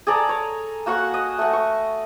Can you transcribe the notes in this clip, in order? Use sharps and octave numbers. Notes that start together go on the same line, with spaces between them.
G#4 A4 D5 A#5
C#5
A#3 F#4 F#5 C#6
D#5
A3 F#5
C#6